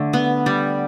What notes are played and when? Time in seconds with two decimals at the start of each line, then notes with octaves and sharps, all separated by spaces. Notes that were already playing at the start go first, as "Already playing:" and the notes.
Already playing: D3 A3
0.13 B3
0.46 G3